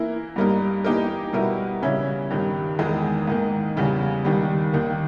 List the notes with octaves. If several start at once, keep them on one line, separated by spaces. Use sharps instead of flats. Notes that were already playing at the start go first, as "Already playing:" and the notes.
Already playing: E3 A#3 E4 A#4
G2 G3 A#3 D#4 A#4
E3 A#3 D#4 G4 A#4
B2 G3 B3 E4 A#4
C#3 E3 G3 C#4 E4
G2 D#3 G3
E2 D#3 G#3
G#2 D#3 A#3
E2 C#3 G3
D#2 D#3 G3
D#2 D#3 A#3